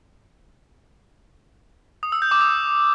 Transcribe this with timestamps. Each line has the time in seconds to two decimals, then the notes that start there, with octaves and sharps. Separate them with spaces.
2.03 D#6
2.12 E6
2.22 G6
2.31 D6
2.41 D#6